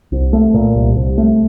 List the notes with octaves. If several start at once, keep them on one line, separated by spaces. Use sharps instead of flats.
C2
A3
A#2
C2
C2
A3